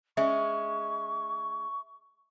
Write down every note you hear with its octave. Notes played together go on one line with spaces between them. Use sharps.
G#3 C#4 E5 C#6